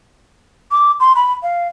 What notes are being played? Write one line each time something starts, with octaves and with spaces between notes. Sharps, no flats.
D6
C6
B5
F5